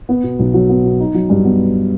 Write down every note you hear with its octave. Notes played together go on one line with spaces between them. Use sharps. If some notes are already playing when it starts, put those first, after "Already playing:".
B3
B2
B1
F#3
B3
B2
D#4
F#3
G2
B3